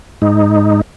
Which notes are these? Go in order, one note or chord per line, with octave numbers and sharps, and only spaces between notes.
G#2 D#4